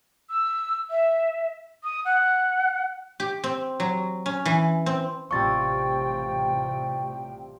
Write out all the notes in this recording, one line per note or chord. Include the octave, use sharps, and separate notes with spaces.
E6
E5
D#6
F#5
G4
C4
F#3
C#4
E3
C4
A1 C3 F3 G3 C4 G5 C#6 A6